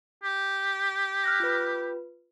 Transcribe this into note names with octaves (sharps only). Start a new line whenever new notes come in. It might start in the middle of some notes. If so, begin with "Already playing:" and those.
G4
F6 F#6 A#6
F4 B4